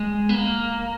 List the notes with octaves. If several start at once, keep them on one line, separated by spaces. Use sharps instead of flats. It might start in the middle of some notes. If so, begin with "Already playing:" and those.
Already playing: G#3
B3
A#3